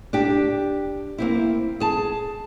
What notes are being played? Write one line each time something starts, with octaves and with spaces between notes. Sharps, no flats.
D4 G4
A#3 C4 E4
G#4 A5